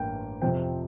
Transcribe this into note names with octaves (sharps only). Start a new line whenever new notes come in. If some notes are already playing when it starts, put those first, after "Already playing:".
Already playing: A1 G2 A#3 G5
F2 C3 F3 C4 G5